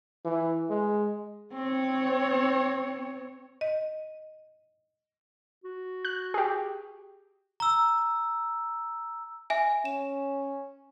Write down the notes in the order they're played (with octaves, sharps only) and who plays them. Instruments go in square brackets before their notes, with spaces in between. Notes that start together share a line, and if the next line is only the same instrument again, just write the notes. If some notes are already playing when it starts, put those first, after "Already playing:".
[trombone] E3
G#3
[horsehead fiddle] C4 C#5
[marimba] D#5
[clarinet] F#4
[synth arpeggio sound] F#6
G4 G#4
[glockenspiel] A#5 E6
[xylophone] E5 G#5
[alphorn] C#4 [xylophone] E7